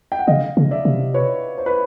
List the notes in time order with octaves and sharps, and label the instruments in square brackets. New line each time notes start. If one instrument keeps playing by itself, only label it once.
[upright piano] G5
F#5
[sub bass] C#3 [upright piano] D#5 F5
[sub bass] C#3
[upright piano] D5 E5
[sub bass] C3
[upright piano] B4 C#5
C5
B4